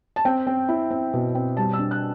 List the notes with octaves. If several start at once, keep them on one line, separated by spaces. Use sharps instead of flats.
A5
C4 G5
C4
E4
C4
B2
C4
G3 A5
E6
D4
F#6